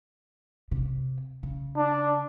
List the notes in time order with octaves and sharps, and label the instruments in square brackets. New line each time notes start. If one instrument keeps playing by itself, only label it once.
[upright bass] C3
C#3
[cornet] D4